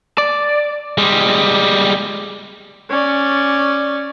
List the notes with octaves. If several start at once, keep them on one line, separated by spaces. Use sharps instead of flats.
D5
G3 G#3
C#4 D5